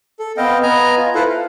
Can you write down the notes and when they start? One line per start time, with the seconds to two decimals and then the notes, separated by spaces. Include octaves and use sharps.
0.19 A4
0.37 B3 C4 D#5 F5 G5
0.63 B3 D#5 G#5 A#5
0.97 F4
1.15 E4 F4 A4 B4 C5
1.29 F5